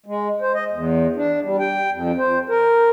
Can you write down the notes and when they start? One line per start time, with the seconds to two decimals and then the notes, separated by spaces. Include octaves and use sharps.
0.06 G#3
0.41 C5
0.54 D#5
0.70 E2
1.16 D4
1.42 G3
1.60 G5
1.92 F2
2.18 C5
2.49 A#4